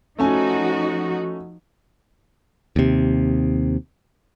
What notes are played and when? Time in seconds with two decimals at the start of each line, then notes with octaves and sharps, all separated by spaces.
0.19 F3 A3 C#4 D#4 F#4 G#5
2.76 D#2 C3